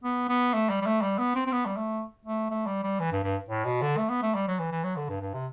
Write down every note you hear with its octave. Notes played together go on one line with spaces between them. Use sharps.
B3
B3
A3
G3
G3
A3
G3
B3
C4
C4
B3
G3
A3
A3
A3
G3
G3
E3
G2
G2
A2
B2
D3
A3
B3
A3
G3
F#3
E3
E3
F#3
D3
G2
G2
C3